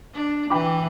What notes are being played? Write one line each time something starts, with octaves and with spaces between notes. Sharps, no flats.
D4
E3 G5 B5 D6